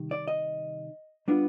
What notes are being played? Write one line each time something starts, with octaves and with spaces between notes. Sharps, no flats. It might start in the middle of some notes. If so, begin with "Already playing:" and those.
Already playing: C3 D#3 G3
D5
D#5
G3 B3 D4 F4